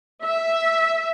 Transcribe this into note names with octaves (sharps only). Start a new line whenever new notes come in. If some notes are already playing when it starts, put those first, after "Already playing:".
E5